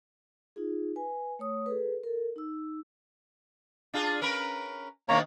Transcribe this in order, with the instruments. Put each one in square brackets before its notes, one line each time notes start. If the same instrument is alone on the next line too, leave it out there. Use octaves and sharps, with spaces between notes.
[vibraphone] D#4 F4 G#4
B4 G#5
A3 C#5 D#6
G#4 A4 B4
A4 A#4
D#4 E6
[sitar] D4 F4 G#4
C#4 A#4 B4
[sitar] B2 D#3 D4 [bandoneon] A#3 C#5 A#5